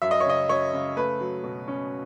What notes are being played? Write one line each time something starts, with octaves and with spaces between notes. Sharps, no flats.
F#2 E5
D#5
C#5
C#3 D#5
F#2 C#5
C#3
A3 B4
F#3
B2
C#4